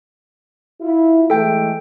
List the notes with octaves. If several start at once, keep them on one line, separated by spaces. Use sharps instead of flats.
E4 F4
E3 G#3 A3 A4 G5